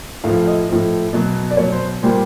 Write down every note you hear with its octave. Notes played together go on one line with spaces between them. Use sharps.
A2 F3 F5
D#5
A2 F3
B2 F#3
D5
B2 F#3 C#5
C5
A#2 G3 C5